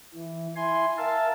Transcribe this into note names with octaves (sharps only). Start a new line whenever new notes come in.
E3
E4 G#5 C6
A#4 E5 F5 A5